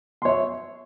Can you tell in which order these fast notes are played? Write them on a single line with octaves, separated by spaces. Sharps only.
C6 C#5 E5